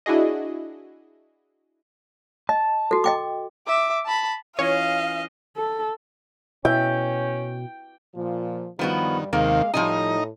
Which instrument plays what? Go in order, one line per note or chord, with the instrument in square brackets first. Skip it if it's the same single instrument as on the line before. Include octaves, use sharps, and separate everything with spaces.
[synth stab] D4 E4 F#4 G#4 D#5
[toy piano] D#5 [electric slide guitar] A5
[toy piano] F#4 A4
D#5 G5 D6
[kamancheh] E5 D6
A5 B5
[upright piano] E3 C#4 F4 [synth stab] C#5 [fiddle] D#5 [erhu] F5
[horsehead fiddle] A4
[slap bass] B2 [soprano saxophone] C#4 [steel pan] E4 E5 [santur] G5
[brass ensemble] A#2 F3
[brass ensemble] G2 G3 [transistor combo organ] D#3 [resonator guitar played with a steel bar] F3 B3 F#4
[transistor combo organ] D#2 C3 D#3 [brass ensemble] G#3 F5 [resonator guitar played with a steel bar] A#3
[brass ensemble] A2 [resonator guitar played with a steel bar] F3 G3 G#5 [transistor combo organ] D#4 D#5 A#5